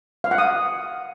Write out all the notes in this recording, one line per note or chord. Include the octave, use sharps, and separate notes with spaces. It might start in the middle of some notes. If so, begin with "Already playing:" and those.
F5
F#5
D#6